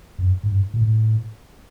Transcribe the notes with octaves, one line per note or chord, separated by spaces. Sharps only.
F2
F#2
G#2
G2
A#2
A2